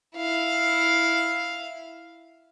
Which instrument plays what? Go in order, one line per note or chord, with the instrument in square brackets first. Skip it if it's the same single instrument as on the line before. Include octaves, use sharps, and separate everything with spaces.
[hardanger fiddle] E4 F5